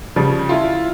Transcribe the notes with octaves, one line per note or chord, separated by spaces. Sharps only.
C#3 F3 G3
E4 F4